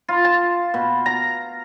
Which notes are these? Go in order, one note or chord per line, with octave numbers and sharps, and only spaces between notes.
F4
A5
B2
A#5